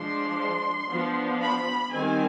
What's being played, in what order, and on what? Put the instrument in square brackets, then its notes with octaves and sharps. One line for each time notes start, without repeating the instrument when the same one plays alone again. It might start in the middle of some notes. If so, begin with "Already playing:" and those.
Already playing: [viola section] F3 G#3 D4 C6
F3 B3 D4
B5
D#3 G3 C4 G#5